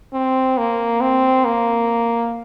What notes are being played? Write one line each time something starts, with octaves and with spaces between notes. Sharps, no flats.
C4
A#3
C4
A#3